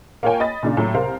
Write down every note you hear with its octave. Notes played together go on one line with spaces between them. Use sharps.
A#3 F4 A#4 C#5 G5 G#5
D#5 B5 D#6 A6
A#2 C#3 D4
A2 F#3
C2 A#4 C5 F5